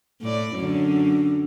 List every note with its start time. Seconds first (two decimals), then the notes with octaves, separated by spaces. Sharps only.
0.21 A2 D5
0.54 F#2 D3